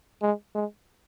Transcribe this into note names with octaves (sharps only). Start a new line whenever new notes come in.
G#3
G#3